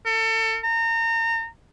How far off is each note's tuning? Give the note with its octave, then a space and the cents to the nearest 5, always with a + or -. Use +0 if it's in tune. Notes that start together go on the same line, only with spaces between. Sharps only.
A4 +30
A#5 -30